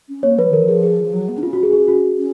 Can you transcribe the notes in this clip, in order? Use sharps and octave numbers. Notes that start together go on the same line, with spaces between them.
C#4
A#3 C#5
F3 B4
D#3 A#4
F3
G#4
G#4
F3
F#3
B3
D#4
C#4 F4
F#4
G#4
G#4
F#4
C#4